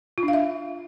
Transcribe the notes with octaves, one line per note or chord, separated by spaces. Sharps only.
F4
D4
F5
E5